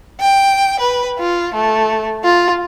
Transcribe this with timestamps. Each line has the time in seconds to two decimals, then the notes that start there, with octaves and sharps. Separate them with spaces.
0.19 G5
0.80 B4
1.19 F4
1.53 A3
2.25 F4